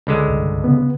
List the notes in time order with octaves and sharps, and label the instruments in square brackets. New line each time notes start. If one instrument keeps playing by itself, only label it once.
[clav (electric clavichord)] C#2 D3 G#3
[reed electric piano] C2 G2
C#3 B3